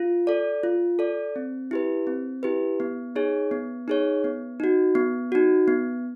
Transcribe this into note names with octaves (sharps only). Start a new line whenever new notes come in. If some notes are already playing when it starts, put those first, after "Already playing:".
Already playing: F4
A4 D5
F4
A4 D5
C4
E4 G4 B4
C4
E4 G4 B4
B3
D#4 G#4 C#5
B3
D#4 G#4 C#5
B3
D#4 F#4
B3
D#4 F#4
B3